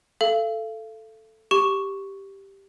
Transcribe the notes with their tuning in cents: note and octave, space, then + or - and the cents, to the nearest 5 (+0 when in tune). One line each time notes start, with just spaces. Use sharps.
A4 +0 F5 -35
G4 +0 C#6 +0